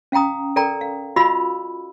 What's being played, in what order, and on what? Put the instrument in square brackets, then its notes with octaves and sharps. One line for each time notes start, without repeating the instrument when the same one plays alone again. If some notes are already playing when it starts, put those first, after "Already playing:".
[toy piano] C#4 F5 G5 A#5 D#6
A4 A#4 D5 G5 A#5
F5
F4 F#4 D#5 F5 B5 E6